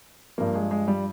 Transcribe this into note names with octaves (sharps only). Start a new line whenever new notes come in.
G2 F3 A#3
G#3
G#3
G3